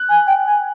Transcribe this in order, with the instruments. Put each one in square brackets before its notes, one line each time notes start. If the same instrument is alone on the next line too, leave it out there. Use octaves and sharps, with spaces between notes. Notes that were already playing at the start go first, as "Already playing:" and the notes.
Already playing: [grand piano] F#6
[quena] G#5
G5
G#5